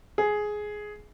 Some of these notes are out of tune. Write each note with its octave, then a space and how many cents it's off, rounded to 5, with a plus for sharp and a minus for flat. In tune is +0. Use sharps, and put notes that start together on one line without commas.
G#4 +10